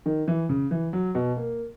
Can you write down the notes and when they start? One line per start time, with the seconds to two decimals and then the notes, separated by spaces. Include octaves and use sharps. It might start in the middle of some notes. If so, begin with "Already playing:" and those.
0.06 D#3
0.28 E3
0.49 C#3
0.71 E3
0.93 F#3
1.15 B2
1.37 A#3